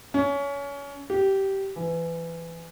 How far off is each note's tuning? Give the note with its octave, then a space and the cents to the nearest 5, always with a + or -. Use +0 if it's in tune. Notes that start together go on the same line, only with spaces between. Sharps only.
C#4 +25
G4 -15
E3 +20